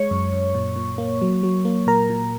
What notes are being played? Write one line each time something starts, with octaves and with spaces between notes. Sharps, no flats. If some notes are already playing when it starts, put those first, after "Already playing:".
Already playing: G#3 C#5 C#6
F#2
F#2
A#2
A#2
A#3
F#3
F#3
A#3
A#2 A#4 A#5
A#2